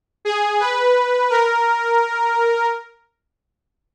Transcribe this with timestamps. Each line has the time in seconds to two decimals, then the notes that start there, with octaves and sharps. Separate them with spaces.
0.25 G#4
0.60 B4
1.30 A#4